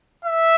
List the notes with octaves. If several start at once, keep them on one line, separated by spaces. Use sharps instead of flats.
E5